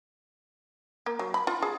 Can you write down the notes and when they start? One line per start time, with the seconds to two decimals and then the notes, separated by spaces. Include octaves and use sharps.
1.06 A#3
1.19 F#3
1.34 B5
1.47 F4
1.62 G#4